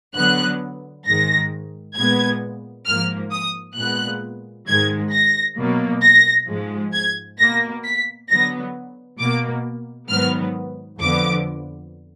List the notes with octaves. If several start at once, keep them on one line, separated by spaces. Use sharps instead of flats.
D3 F#3 B3 F#6
G#2 D#3 G#3 A#6
A#2 G#3 B3 G#6
G#2 F3 A#3 F6
D#6
A#2 G#3 B3 F#6
G#2 D#3 G#3 G#6
A#6
B2 F#3 A#3
A#6
G#2 F3 G#3
G#6
B2 A#3 A#6
B6
D3 F#3 B3 A#6
B2 A#3 D6
G#2 D#3 F#3 B3 F6
F2 D3 F3 B3 D6